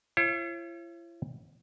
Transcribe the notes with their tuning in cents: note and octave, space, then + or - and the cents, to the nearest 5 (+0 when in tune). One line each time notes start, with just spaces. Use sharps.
E4 +45 C#5 -40